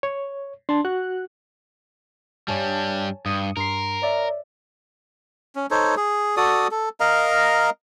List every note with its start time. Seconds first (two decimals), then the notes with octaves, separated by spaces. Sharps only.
0.03 C#5
0.69 D4 A5 C6
0.85 F#4 F#6
2.48 G2 G3 C#5 G#5 A5
3.26 G2 D#6 C#7 D#7
3.57 G2 A#4 C6 C7
4.02 C#5 D5 E5
5.56 C#4
5.71 D#4 A4 C5 C#5
5.97 G#4
6.37 F#4 A4 D5 D#6
6.71 A4
7.00 A#4 D#5 F5 A#5